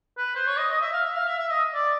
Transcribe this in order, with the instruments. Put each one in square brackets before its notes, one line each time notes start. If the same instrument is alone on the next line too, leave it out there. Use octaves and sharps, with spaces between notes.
[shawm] B4
C5
C#5
D#5
D#5
E5
F5
E5
F5
E5
E5
D#5
D5